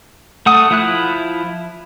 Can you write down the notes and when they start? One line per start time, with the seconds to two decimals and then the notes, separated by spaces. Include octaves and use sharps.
0.46 A3 F#5 D#6
0.70 F3 E4 F#6